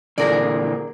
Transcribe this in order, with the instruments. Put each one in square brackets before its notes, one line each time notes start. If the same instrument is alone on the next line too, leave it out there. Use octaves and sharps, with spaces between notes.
[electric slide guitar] A#2 D3 E3 [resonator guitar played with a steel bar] G#4 A#4 D5